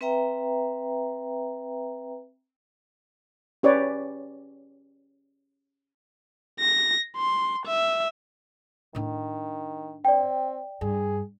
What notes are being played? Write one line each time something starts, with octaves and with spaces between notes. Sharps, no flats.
C4 B4 E5 G5 A#5
C#4 G4 B4 C#5 D5
A#6
C6
E5
A2 D#3 D4
C4 D5 G5
G2 G#4